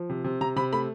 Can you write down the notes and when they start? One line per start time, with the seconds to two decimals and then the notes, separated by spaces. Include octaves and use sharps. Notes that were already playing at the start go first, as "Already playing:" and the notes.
Already playing: F3
0.09 C3
0.24 C3
0.41 C3 A#5
0.56 C3 B5
0.73 A3 B5